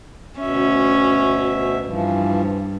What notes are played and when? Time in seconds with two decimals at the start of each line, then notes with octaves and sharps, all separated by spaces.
0.40 D2 B2 C#4 E5
1.87 G2 E3 F3